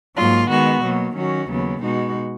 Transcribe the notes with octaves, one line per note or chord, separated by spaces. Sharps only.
G#2 F#3 A#3 F4
D#3 G#3 B3 F#4
B2 F#3 A#3
D#3 F#3 C#4 F#4
D#2 C#3 F#3 B3
B2 G#3 D#4 F#4